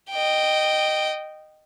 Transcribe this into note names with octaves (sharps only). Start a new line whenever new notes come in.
D#5 G5